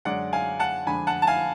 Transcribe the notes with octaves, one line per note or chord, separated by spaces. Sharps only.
F#2 D3 G#3 C#4 D5 F#5
F5 G#5
F#5 A5
F2 D3 G#3 D4 G#5 B5
F#5 A5
A5
F5 G#5